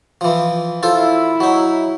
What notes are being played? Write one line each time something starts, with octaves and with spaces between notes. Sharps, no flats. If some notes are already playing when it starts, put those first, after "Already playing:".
E3 F3
E4 F4 A4 C5
F#3 D#4